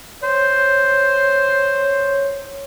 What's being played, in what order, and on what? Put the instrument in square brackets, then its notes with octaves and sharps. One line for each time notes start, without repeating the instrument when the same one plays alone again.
[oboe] C5 [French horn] C#5